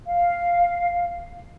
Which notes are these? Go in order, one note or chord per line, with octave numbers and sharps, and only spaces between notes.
F5